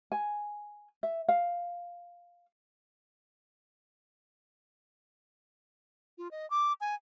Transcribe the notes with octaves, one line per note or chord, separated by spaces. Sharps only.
G#5
E5
F5
F4
D#5
D6
G#5